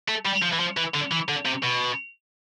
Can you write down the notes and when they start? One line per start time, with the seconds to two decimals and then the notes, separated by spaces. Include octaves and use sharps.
0.09 A3
0.26 G3
0.43 F3
0.53 E3
0.60 F3
0.77 E3
0.94 D3
1.11 E3
1.28 D3
1.45 C3
1.63 B2